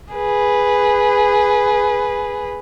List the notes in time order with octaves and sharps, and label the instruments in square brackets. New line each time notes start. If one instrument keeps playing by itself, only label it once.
[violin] G#4 B4